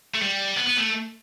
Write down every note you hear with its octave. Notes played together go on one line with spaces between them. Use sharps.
A3
G3
B3
B3
A3